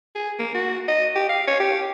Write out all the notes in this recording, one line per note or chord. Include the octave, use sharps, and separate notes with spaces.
G#4
A#3
F#4
D#5
G4
F5
C#5
G4